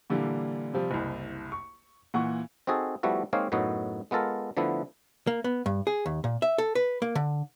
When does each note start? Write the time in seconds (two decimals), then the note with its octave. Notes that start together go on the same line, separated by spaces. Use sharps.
0.10 A#2 D3 E3 G3 A#3
0.74 C3 F3 G3
0.91 F#1 C2
1.52 C#6
2.14 A#2 E3 F#5 C#6
2.67 C4 D#4 F#4 G#4 A4
3.03 F3 G3 A3 B3 E4 F#4
3.33 G#3 A#3 C4 D#4 C#5 F5
3.52 F#2 A2 B3 D#4 F#4
4.11 G#3 B3 F4 A4 A#4
4.57 D3 F3 A3 B3 E4
5.27 A#3
5.44 B3
5.66 G2
5.87 G#4
6.06 D#2
6.24 A#2
6.42 E5
6.58 A4
6.75 B4
7.02 A#3
7.15 D3